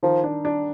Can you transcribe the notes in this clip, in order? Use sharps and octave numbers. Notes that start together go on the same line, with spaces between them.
D#3 F3
D4
D4